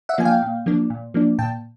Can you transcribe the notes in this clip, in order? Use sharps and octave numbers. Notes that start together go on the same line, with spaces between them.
E5 F#5
F3 A#3 D4 G#5
F5 G5
A#2
F3 A#3 D4
A#2
F3 A#3 D4
A#2 G5 A5